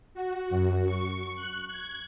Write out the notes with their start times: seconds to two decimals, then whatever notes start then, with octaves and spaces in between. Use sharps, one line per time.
0.14 F#4
0.50 F#2
0.86 C#6
1.35 F#6
1.68 G#6